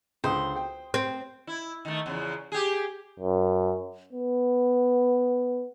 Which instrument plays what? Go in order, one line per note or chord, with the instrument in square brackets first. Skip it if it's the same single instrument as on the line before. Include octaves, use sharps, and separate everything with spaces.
[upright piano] C#2 D3 D#6 [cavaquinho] C5
[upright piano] G5
[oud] C4
[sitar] E4
D#3 A3
E2 C#3 F3
G4 G#4
[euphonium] F#2
B3